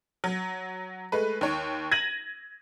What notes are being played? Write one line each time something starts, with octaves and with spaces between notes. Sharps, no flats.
F#3
G#3 A3 B4
D#2 C#5
G#6 A#6 D#7 F#7